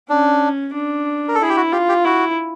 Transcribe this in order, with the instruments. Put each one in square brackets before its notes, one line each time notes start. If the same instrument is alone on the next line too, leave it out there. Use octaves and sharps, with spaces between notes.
[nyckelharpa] C#4 [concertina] D4
[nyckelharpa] D4
[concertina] A#4
A4
[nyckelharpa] E4 [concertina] G#4
[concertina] G4
F#4
[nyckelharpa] F4 [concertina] G4
[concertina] G4
[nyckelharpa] E4 [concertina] F#4